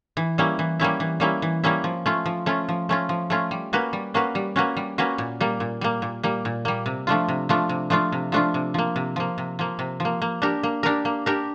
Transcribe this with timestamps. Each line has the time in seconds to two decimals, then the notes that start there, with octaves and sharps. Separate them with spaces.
0.17 E3
0.38 G3 A#3 C#4 E4
0.59 E3
0.79 G3 A#3 C#4 E4
1.00 E3
1.20 G3 A#3 C#4 E4
1.42 E3
1.64 G3 A#3 C#4 E4
1.84 F3
2.06 A3 C#4 F4
2.26 F3
2.46 A3 C#4 F4
2.69 F3
2.89 A3 C#4 F4
3.09 F3
3.30 A3 C#4 F4
3.51 G3
3.73 A#3 C#4 F#4 B4
3.93 G3
4.14 A#3 C#4 F#4 B4
4.35 G3
4.56 A#3 C#4 F#4 B4
4.77 G3
4.98 A#3 C#4 F#4 B4
5.18 A#2
5.40 G3 A#3
5.60 A#2
5.81 G3 A#3
6.02 A#2
6.23 G3 A#3
6.45 A#2
6.65 G3 A#3
6.86 C3
7.07 F3 A3 D4 F4
7.28 C3
7.49 F3 A3 D4 F4
7.69 C3
7.90 F3 A3 D4 F4
8.12 C3
8.32 F3 A3 D4 F4
8.54 C3
8.74 F3 A#3
8.96 C3
9.16 F3 A#3
9.38 C3
9.59 F3 A#3
9.79 C3
10.00 F3
10.05 A#3
10.22 A#3
10.42 D4 G4 A#4
10.63 A#3
10.83 D4 G4 A#4
11.05 A#3
11.26 D4 G4 A#4